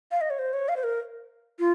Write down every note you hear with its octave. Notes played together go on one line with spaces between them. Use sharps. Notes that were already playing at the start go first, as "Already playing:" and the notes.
F5
D#5
C#5
C5
C#5
F5
C5
A#4
F4